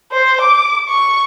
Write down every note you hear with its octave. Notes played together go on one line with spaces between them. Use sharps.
C5
D6
C#6